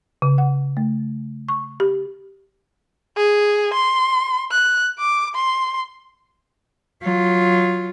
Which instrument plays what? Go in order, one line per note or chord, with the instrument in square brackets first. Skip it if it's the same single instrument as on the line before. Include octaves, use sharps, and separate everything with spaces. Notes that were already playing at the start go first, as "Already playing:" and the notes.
[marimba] C#3
F#5
A3
C#6
G4
[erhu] G#4
C6
F#6
D6
C6
[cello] F#3 F4